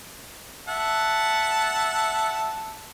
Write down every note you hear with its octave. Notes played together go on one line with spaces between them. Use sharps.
E5 F#5 A5